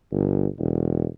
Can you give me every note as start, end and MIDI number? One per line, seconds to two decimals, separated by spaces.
0.12 0.47 31
0.59 1.06 28